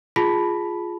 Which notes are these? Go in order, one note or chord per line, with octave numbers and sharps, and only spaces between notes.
F4 G#4 A5 B5 B6